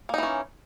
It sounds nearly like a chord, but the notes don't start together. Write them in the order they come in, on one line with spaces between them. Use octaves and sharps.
A#3 D#4 E3 C#4